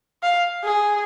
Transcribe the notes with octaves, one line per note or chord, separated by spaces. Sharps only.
F5
G#4